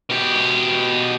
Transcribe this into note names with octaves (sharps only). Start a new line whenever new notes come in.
B2 G4